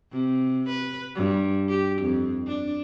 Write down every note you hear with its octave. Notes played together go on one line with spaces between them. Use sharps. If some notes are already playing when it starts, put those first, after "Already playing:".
C3
B4
G2
G4
F2
D4